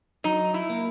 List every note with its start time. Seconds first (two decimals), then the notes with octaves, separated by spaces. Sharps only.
0.24 F#3 D#4
0.54 E4
0.70 A#3 D#4 A#4